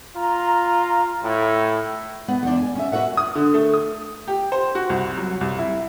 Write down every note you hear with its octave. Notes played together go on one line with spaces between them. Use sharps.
F4 A#5
A2
B3
E2 D4
G#5
C#4 E5
F#4 A#4 B4 E5 F#5
D#6
D3
A3
D#6
G4
C5
F#4
C2
F#3
C2
E4